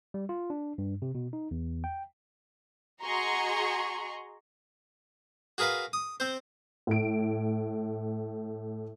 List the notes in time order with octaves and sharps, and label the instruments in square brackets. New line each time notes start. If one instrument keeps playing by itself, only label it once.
[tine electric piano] G3
F4
D4
G2
C3
B2
D#4
E2
G5
[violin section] F#4 G#4 D#5 A#5 C6 C#6
[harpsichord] F#4 G#4 A#4 B4 F5
D#6
C4 C5
[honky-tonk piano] A2 D7